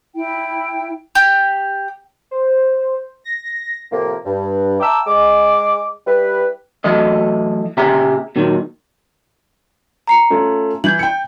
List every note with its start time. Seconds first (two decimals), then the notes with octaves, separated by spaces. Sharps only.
0.15 E4 G5
1.15 G4
2.31 C5
3.24 A#6
3.92 A2 C3 F3 A#3
4.25 G2
4.80 E5 G5 A5 A#5 D6 E6
5.07 G#3 D6
6.07 G3 E4 G4 B4
6.84 E3 F#3 A3 D#5
7.77 A#2 C#3 G4 G#4 E5 A#5
8.36 A#2 D#3 F#3
10.07 A#5 C7 C#7
10.30 A3 C#4 F4
10.84 E3 G6 G#6 F#7
10.99 G5 C#7